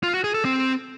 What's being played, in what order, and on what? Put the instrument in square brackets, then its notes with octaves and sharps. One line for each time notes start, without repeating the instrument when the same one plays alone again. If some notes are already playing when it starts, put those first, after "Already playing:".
[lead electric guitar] F4
F#4
G#4
A4
C4